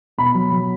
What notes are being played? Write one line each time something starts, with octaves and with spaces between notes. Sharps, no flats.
B2 B5
F#3
F#3